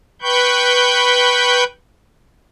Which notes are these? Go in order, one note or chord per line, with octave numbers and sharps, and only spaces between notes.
B4 G5 B5 C#6 G6